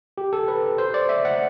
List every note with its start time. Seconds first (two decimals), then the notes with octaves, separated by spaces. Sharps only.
0.18 G4
0.33 A4
0.48 B4
0.78 C5
0.94 D5
1.09 E5
1.25 F#5